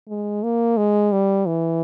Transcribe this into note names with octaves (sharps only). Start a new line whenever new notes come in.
G#3
A#3
G#3
G3
E3